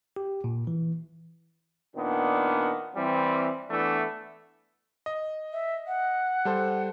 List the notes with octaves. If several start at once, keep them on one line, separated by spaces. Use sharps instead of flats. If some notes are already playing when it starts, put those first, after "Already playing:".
G4
A#2
E3
A#2 D#3 B3 D4
E3 G3 C4
E3 A3 B3 D4
D#5
E5
F#5
G3 A4 C5